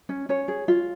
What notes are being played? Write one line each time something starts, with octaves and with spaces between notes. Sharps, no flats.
C#4
C#4 C#5
G#4
F4